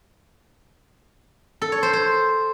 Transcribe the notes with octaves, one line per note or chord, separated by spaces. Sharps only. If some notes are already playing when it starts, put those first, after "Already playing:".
A4
C#5
C5
C5